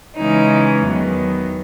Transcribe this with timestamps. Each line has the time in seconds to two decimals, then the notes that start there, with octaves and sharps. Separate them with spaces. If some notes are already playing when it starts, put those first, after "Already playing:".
0.17 C#3 E3 G#3 C#4 D#4
0.83 E2 D#3 F#3 B3